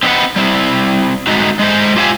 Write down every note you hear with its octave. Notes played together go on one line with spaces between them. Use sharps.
C4 D#4 F4 B4 F#5
G3 C4 E4
G#3 A3 D#4 F#4
G#3 A3 C5
F4 G4 E5 F5 G5 G#5